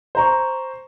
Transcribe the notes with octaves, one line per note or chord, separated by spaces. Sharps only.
C5 A#5 C#6